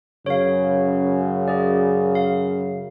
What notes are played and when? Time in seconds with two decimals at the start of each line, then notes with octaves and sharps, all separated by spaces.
0.26 F#2 C#3 C#5 F5
1.48 G#4 D5
2.15 F5